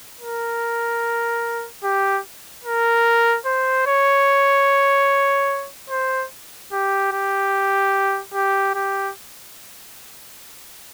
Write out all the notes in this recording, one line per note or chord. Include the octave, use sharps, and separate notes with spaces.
A#4
G4
A#4
C5
C#5
C5
G4
G4
G4
G4